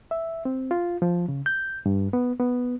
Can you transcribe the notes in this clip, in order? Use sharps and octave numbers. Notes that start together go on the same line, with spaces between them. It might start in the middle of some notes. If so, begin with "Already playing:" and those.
E5
C4
F4
F3
C#3
G6
G2
B3
B3